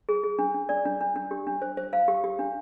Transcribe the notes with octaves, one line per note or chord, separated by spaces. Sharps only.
G#4
G#4
D4
D4
D4 D5
D4
D4
D4
G4
D4
C5
C5
C5 F5
G4
G4
D4